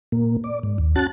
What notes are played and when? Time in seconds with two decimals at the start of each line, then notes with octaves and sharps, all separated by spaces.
0.12 A#2 A#3
0.44 D5
0.63 G#2
0.78 D#2
0.96 C#4 F#4 A5 F#6 A6